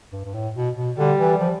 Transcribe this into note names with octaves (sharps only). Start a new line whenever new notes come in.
G2
G2
A2
B2
B2
D3 G3
E3
F3